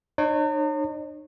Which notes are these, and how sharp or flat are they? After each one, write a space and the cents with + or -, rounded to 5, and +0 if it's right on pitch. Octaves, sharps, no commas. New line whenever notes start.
D#4 -45 C#5 -25